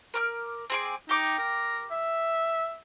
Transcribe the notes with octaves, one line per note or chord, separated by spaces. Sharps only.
A#4 D6 F6
C4 G#4 D6
D#4 G4 D6
A#4
E5